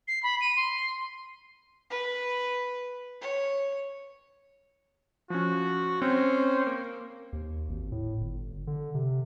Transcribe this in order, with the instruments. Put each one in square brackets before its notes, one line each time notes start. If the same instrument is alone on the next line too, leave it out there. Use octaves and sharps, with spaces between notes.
[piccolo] C7
B5
D#7
C6
[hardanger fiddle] B4
C#5
[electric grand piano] F3 C#4 [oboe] F#4
[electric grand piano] C4 [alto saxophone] C#4 [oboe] C5
[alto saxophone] A#3
[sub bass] D#2
G#1
A2
G1
D3
C3